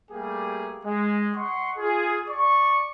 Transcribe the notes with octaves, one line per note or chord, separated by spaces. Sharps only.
G3 A3 A#3 G4 G#4
G#3
D#5 F#5 C6 C#6
F4 G#4
D5 C#6